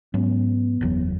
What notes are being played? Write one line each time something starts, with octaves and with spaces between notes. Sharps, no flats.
G#2 F#3 B3 C#4
F#1 E2 F#3